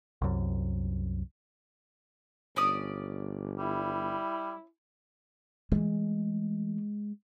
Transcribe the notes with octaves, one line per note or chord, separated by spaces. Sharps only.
C2 F#2
G1 C#4 D5 D#6
G3 E4
E3 G#3 A3